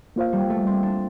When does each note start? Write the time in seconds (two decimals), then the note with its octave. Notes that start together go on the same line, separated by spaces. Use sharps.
0.16 A#3 F4 C5 F5
0.33 G3
0.50 A3
0.67 C4
0.83 D4